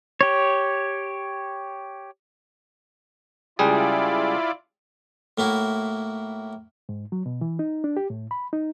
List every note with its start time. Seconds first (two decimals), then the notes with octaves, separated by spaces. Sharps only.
0.21 G4 C#5
3.59 C#2 G3 E4 F4 G#4 D5
5.38 A2 A#3 E4 F#4
6.89 G#2
7.12 F#3
7.26 B2
7.41 E3
7.59 D#4
7.84 D4
7.97 G4
8.10 A2
8.31 B5
8.53 D#4